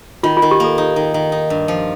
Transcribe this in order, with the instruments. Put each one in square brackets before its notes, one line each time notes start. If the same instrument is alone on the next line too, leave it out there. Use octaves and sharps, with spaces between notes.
[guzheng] D#3 [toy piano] F4
[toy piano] F4
[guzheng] D#3
[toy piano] G4
[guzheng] A#3 [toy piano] A4
[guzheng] D#4
D#3
D#3
D#4
G2
F3